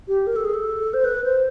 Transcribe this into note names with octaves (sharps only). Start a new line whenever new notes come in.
G4
A#4
A4
G#4
A4
C5
B4
C5